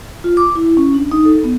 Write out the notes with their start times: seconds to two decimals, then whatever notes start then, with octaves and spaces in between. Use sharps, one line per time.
0.24 F4
0.37 D6
0.55 E4
0.77 C#4
0.94 D4
1.11 D#4
1.25 A4
1.44 B3